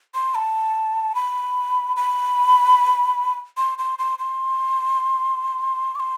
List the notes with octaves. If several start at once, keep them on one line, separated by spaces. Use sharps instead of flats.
C6
A5
B5
B5
C6
C6
C6
C6
D6
C6